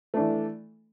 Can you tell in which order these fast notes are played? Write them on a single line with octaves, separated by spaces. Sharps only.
A3 D4 E3